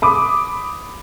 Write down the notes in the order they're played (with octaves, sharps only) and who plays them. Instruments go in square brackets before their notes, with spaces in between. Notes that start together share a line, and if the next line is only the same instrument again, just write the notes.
[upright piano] B5 D6 D#6